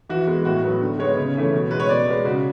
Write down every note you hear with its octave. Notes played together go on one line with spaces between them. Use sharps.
E3 F#4
G#3 B3
A2 F#4
F#3 B3
D3
G#3 B3 C#5
C#3
E3 A3 C#4
B2
G#3 B3 B4
C#5
B2 D5
G#3 B3
C#3 F#4